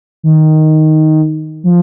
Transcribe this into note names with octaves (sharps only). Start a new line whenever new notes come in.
D#3
F3